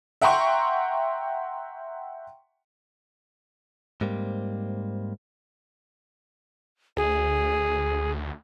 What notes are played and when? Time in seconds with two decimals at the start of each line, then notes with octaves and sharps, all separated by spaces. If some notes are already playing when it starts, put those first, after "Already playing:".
0.22 E5 F#5 G5 A#5 C6 C#6
4.01 G#2 G3 A#3 C4
6.97 D2 G#4